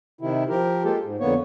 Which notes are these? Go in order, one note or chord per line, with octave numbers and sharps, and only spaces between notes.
C3 D#3 E4
F3 G4 A#4
G#3 A#3 F4 G4 A4
G#2
F2 D3 A#3 B3 C#5